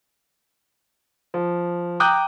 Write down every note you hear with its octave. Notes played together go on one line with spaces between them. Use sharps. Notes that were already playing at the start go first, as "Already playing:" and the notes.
F3
G5 A#5 D6 D#6 F#6 G6